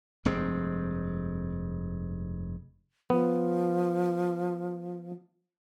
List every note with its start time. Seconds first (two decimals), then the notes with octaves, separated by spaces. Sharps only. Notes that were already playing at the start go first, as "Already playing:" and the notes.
0.25 F1 G2 G#3 C4
3.10 F3 B3